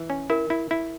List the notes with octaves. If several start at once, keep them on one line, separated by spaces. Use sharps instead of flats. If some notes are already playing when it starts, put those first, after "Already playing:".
Already playing: E3
C#4
E4 A#4
E4
E4